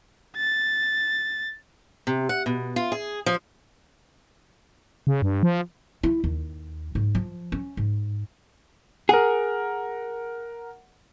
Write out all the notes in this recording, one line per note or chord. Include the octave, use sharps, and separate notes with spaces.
A6
C3
F#5
B2
F4
G#4
F3
C#3
G2
F3
E4
D#2
G#2
F3
C#4
G#2
G#4 A#4 F#5